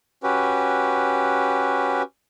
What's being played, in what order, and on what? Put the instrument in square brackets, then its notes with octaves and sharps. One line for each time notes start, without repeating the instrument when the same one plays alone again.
[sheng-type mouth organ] C#4 F#4 G4 B4